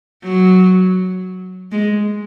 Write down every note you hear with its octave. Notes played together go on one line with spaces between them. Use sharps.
F#3
G#3